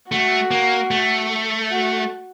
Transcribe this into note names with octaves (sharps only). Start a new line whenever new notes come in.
A3 F#4
A#3
A3
F#4